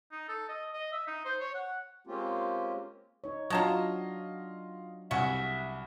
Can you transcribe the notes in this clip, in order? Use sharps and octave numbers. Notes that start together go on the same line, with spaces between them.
D#4
A4
D#5
D#5
E5
D#4
C5
C#5
F#5
G#3 A#3 C4 C#4 F4 G4
D#4 C#5
F#3 D4 F4 F#4 C#5 D#5 A5 A#5
C2 C#3 F#4 E5